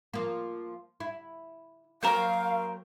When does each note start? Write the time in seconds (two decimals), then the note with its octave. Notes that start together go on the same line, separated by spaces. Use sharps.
0.14 F3 A#3
1.00 E4
2.03 F#3 A#3 A#4 C5 F5 G5